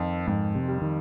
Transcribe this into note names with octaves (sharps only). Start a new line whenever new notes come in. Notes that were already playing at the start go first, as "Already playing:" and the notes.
Already playing: F2 D#3
F2 G#2
C3
G3
D#3